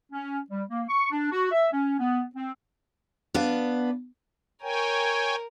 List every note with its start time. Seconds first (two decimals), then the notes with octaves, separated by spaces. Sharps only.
0.12 C#4
0.50 G3
0.70 A#3
0.89 C#6
1.11 D4
1.32 F#4
1.51 E5
1.73 C#4
1.99 B3
2.36 C4
3.34 B3 D4 B4 F5
4.62 A#4 C#5 G5 G#5